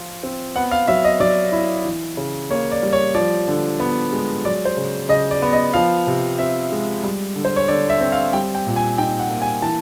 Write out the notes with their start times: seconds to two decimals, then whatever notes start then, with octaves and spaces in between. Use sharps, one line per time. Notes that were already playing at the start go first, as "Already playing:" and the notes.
Already playing: F3 F4
0.23 C4
0.56 B3 F#5
0.71 F5
0.88 F#3 E5
1.04 D#5
1.20 F#3 D5
1.52 E4
1.85 E3
2.17 C#3
2.51 A#3 C#5
2.72 D5
2.83 G3
2.93 C#5
3.15 F3 D5
3.48 D3
3.80 B3
4.12 G#3
4.45 F#3 D5
4.65 C5
4.77 C#3
5.09 C#3 D#5
5.31 D5
5.42 B3
5.53 D#5
5.74 F3 F5
6.07 C3
6.39 C4 E5
6.72 G#3
7.04 G3
7.35 D3
7.45 C5
7.56 C#5
7.68 D3 D5
7.90 E5
8.01 C4
8.12 F5
8.33 G3 G5
8.55 G5
8.66 A#2
8.76 G#5
8.98 D#4 G5
9.19 F#5
9.30 A#3
9.42 G#5
9.62 E3 A5